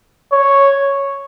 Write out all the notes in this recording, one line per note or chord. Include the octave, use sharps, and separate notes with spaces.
C#5